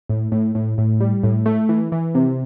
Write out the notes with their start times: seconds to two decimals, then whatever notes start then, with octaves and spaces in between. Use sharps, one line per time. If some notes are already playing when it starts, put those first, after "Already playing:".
0.09 A2
0.32 A2
0.55 A2
0.78 A2
1.00 G3
1.23 A2
1.46 A3
1.69 E3
1.92 E3
2.15 C3